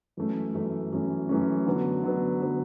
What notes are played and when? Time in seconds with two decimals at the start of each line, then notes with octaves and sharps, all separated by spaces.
0.17 F#2 E3 A3 C#4
0.54 F#2 E3 A3 C#4
0.92 F#2 E3 A3 C#4
1.29 F#2 E3 A3 C#4
1.67 D3 F#3 B3
2.04 D3 F#3 B3
2.42 D3 F#3 B3